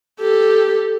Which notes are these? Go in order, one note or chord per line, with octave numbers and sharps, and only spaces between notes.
G4 A4